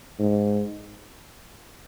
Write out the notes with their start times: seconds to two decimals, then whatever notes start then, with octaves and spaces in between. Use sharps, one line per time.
0.19 G#2